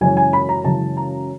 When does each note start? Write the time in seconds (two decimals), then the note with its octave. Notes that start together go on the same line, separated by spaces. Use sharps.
0.01 F#2 C#3 E3 G#3 C#4 G#5
0.17 G#5
0.33 B5
0.49 A#5
0.64 F#2 C#3 E3 G#3 C#4 A5
0.97 A#5